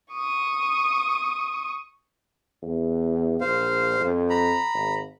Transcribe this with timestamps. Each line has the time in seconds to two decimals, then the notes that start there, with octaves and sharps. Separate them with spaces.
0.14 C#6 D#6
2.63 E2
3.41 A#1 C5 F5
4.00 F2
4.30 A#5 B5
4.75 G#1